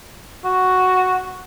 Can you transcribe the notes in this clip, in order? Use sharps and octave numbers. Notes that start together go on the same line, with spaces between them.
F#4